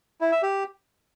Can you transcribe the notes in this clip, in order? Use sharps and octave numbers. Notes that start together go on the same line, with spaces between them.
E4
E5
G4